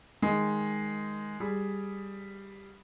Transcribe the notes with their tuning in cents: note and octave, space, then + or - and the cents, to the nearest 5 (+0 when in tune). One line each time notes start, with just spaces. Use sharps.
D#3 +0 G#3 +0
G3 +5 G#4 +0